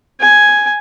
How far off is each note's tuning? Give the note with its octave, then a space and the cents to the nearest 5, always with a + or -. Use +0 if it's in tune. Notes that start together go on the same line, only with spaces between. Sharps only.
G#5 +5